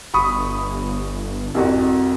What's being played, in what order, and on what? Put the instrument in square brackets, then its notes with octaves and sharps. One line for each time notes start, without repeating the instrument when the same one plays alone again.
[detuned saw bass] G1 [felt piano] B5 C#6 D#6
[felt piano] C2 F2 F#4